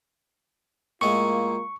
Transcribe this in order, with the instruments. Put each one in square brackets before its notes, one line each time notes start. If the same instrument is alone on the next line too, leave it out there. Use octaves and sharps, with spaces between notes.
[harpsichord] A2 G#3 [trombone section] A#3 F4 [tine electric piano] C#6